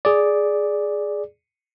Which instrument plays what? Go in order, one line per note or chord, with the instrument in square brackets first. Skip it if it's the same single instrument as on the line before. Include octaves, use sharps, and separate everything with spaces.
[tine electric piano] G#4 D5